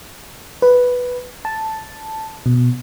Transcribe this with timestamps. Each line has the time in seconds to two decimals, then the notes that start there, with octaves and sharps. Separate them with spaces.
0.62 B4
1.45 A5
2.46 B2